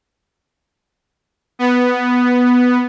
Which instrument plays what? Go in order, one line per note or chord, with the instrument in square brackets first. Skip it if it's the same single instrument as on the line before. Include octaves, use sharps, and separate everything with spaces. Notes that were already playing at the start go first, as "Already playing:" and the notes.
[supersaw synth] B3